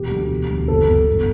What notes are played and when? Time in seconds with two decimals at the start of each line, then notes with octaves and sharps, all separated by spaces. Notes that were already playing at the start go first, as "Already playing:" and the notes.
Already playing: E1 G4
0.11 D2
0.30 E1
0.49 D2
0.68 F#1 A4
0.88 E2
1.07 G1